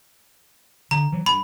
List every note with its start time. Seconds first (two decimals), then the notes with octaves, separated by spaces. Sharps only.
0.91 D3 A#5
1.12 E3 F#3
1.26 G2 B5